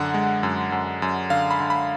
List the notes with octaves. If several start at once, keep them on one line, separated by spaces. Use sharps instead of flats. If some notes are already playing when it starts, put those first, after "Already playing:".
Already playing: F#2 D3 F#5
G#3
F#2
F#2
F#2
D3 F5
B5
D3
B5